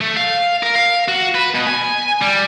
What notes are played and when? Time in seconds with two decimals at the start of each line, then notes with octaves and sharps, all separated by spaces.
0.01 A3
0.17 F5
0.63 A#4
0.75 F5
1.08 F#4
1.35 B4
1.55 B2
1.67 G#5
2.21 G3